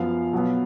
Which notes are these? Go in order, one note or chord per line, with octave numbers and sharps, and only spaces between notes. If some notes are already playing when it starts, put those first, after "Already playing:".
Already playing: F#2 F3 B3 F5
B2 F#3 B3